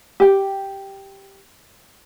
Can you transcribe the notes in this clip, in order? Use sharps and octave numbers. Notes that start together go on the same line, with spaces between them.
G4 G5